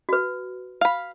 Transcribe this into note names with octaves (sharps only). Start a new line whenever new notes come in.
F#4 B4
F5 B5